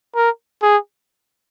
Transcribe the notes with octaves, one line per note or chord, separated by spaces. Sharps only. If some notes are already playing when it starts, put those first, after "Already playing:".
A#4
G#4